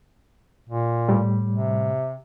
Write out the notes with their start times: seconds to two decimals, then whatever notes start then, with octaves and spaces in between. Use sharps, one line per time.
0.69 A#2
1.09 A2 G3
1.50 C3